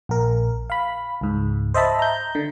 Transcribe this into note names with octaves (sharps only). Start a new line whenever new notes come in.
A#1 A#4
F5 B5
C#2 G#2
C5 D#5 E5 A5 B5
A#5 G6
D3